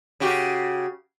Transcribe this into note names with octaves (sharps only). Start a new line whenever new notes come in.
C#3 F#4 G4